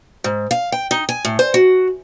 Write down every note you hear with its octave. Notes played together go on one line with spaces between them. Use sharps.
G#2
F5
G5
D#4
G#5
A2
C5
F#4